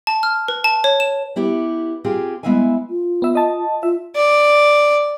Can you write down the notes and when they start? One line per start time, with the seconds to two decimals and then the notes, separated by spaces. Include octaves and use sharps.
0.07 A5
0.23 F6
0.48 B4
0.64 A5
0.84 C#5
1.00 E7
1.36 B3 E4 G4
2.04 C4 F4 G4 G#4
2.43 G#3 B3 E4 E5 F5 G#5
2.89 F4
3.22 B3 E5
3.35 D#5 A5
3.83 F4 E5
4.16 D5